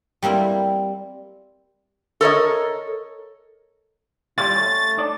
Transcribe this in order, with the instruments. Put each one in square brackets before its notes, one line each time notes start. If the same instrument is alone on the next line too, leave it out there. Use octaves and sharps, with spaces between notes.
[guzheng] G3 A#3 C4 E4
[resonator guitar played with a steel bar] A4 A#4 C#5 D#5
[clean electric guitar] G3 E4 F4 [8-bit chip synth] A6
[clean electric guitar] A3 C#4
D#4 D5 A5